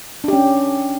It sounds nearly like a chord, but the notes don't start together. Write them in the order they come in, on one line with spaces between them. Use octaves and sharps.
D4 G4 C#4